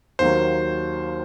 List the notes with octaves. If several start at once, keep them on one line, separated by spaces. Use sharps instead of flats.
D#2 D#3 F#3 A#3 C5